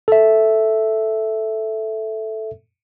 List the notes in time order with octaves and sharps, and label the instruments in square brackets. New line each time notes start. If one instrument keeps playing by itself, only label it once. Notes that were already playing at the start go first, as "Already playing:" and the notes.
[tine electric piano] A4 E5